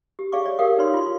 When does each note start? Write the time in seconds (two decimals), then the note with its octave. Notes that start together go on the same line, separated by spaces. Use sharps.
0.19 G4
0.32 G#4 D5 F5 C#6 D6
0.45 C#5 D5
0.59 G4 A#4 F5 D#6
0.78 D#4 B4 C#5 D5 C6
0.94 F4 C6